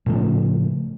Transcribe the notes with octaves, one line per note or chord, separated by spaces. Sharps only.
A2 C#3 F3 A3